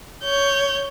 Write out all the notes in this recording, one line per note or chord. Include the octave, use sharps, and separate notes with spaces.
C#5 G6